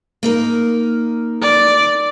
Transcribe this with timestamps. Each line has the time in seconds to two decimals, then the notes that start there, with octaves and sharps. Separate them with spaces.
0.23 A#3 D#4 A#4
1.42 D5